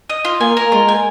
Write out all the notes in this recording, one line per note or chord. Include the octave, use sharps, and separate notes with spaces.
D#5
F4
A#3 G#5
A#4
G#3 F4
G#5